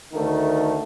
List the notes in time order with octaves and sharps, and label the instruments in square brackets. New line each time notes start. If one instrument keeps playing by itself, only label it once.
[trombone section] D2 D#3 A3